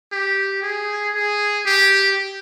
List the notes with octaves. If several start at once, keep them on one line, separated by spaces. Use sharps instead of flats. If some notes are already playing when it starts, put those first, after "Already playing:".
G4
G#4
G#4
G4